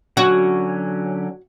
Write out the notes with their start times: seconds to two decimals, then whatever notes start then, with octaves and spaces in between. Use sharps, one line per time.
0.17 D3 F#3 C#4 F#4